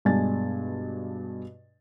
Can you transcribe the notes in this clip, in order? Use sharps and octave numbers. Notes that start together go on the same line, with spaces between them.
G2 B2 G#3 D4 G#5 A6